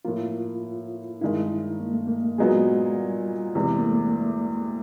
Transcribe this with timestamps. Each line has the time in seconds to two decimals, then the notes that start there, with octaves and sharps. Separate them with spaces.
0.05 A2 F3 A#3 F4
1.21 G2 D#3 G#3 E4
1.80 A#3
1.94 A3
2.07 A#3
2.38 A#2 F#3 G#3 B3 D#4 G#4
2.96 G3
3.55 E2 C3 E3 G#3
3.79 A#3
3.85 A3